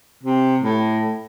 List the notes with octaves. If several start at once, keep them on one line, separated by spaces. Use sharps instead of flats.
C3
A2